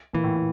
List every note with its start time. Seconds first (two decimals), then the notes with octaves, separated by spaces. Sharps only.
0.13 A#2 E3
0.24 A2
0.37 A2